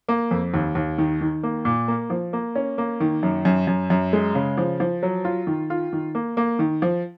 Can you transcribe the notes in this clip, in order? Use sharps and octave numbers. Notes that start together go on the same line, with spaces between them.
A#3
F2
D#2
D#2
D#3
D#3
A#3
A#2
A#3
F3
A#3
C#4
A#3
D#3
F#2
F#2
F#2
F#2
G#3
C#3
F3
F3
F#3
F4
D#3
F4
D#3
A#3
A#3
D#3
F3